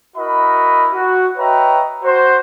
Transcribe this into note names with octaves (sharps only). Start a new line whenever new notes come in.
E4 F#4 A#4 D#5 B5
F#4
B4 C#5 D#5 E5 G5 A#5
F#4 C5